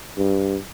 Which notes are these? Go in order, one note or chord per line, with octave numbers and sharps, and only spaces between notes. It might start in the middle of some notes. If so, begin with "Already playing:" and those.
G2